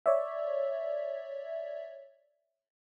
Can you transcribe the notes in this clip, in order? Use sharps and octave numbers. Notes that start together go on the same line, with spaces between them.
C#5 D5 E5